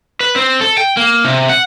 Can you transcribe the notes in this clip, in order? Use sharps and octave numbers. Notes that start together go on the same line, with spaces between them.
B4
C4
A4
G5
A#3
C3
F#5